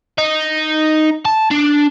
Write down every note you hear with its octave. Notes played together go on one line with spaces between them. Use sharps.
D#4
A5
D4